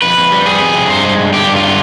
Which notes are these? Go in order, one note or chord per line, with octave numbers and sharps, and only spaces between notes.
F2 B4
F2
G3
C4 G#4
F2
C3
G2 C5
G#3
G2
D3 G4
G2
F4
D3